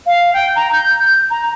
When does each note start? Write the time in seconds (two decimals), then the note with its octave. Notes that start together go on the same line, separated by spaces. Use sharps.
0.06 F5
0.33 G5
0.55 A#5
0.72 G6
0.99 G6
1.30 A#5